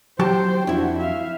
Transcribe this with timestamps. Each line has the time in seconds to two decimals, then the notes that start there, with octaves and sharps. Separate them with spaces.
0.19 F#3 G4 C5 G5 A5
0.67 F2 D4 E4 F#4
0.99 E5 F5